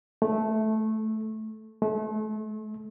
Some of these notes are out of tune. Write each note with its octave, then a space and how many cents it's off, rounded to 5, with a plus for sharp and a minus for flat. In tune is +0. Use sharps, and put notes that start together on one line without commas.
A3 -10
A3 -35